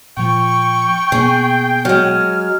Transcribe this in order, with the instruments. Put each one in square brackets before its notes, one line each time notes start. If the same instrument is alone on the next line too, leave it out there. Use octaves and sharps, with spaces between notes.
[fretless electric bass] A#2 F3 [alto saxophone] G5 [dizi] C#6
[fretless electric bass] B2 A#3 B3 [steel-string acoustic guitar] G#4
[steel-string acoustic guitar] F#3 G#3 [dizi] F6